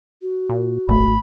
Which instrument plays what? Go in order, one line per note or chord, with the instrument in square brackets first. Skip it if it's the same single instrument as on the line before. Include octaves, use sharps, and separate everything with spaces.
[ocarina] F#4
[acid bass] A#2
[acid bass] D#1 [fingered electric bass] G#1 A3 [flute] B5